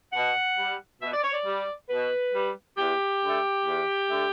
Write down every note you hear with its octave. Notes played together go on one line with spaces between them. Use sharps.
B2 F#5
G3
B2 E5
D5
C#5
D5
G3
B2 B4
G3
E2 G4
D3 A3
E2
D3 A3